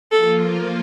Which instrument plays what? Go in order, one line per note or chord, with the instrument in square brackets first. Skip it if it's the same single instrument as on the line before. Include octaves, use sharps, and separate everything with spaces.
[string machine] F3 A#3 F4 [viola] A4